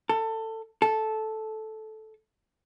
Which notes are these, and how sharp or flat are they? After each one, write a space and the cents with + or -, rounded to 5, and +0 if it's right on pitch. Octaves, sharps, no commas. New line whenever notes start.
A4 +20
A4 -10